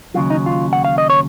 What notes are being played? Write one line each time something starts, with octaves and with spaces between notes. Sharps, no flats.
D#2 C#3 F#3 F4
D#4
F4
F#5
F5
D#5
C#5